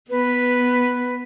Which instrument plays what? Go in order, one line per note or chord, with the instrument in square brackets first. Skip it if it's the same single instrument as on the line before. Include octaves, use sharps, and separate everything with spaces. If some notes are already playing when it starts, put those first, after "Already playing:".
[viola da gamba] B3 [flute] B4